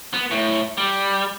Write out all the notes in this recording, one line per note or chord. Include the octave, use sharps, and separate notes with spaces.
B3
A2
G3